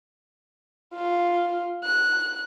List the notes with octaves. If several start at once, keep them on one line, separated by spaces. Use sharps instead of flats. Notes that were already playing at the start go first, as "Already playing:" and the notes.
F4
F#6